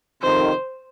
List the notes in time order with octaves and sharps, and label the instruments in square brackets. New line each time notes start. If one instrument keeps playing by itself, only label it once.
[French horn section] F2 C3 D#3 [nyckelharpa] C5